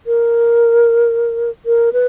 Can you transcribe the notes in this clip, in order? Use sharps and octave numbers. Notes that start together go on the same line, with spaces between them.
A#4
A#4
B4